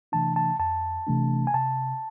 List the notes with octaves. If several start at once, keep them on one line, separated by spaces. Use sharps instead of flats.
C3 E3 A3 D4 A5
A5
F2 A5
C3 E3 A3 D4
G#5
C3 A5